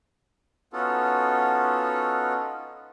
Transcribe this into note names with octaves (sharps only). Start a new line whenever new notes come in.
B3 C#4 D#4 F4 F#4 A4